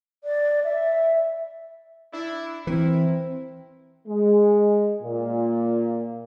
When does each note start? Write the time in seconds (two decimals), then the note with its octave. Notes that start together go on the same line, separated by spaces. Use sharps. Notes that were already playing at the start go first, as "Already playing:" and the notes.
0.24 D5
0.64 E5
2.13 D4 E4
2.67 E3 C4 E4 A#4
4.06 G#3
5.02 A#2